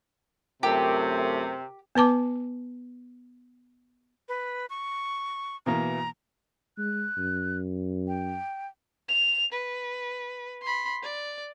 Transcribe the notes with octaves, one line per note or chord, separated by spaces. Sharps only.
F#2 C3 A3 F4 G4 A#4 A5
B3 B4 A5 D6
B4
C#6
B2 E3 A#3 A#5
G#3 F#6
F#2
G5
F7
B4
B5 C6
D5